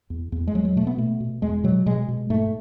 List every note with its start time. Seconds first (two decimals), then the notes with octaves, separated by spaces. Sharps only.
0.10 E2
0.32 E2
0.47 G#3
0.54 E2 F#3
0.65 F#3
0.76 B2 A3
0.87 B3
0.98 B2 A3
1.20 B2
1.42 E2 G#3
1.64 B2 F#3
1.86 B2 G#3
2.08 B2
2.30 G#2 A3